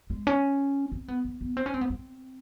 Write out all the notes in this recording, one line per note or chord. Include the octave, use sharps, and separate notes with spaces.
G#3
C#4
C4
B3
B3
B3
C4
C#4
C4
B3
C4